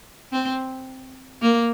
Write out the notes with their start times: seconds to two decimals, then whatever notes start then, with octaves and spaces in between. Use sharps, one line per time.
0.32 C4
1.42 A#3